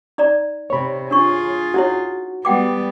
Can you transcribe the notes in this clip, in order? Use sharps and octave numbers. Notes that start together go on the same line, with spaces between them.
D#4 D5 A#5
C3 C#5 B5
D4 F4 G#4 C#6
D#4 E4 F#4 C#5
G3 B3 F#5 G5 D6